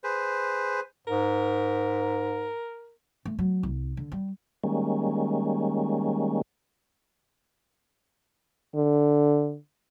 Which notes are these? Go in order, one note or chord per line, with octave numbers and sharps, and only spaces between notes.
G#4 B4 C5
G#2 A#4
A3
F#3
C2
D3
G3
D#3 G3 G#3 A#3 C#4
D3